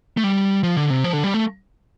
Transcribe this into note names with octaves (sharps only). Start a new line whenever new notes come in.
A3
G3
F3
D3
C3
F3
D3
G3
A3